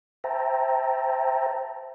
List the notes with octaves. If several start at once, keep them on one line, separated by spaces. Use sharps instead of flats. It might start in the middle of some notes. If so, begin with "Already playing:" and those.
C5 E5 G5 A5 A#5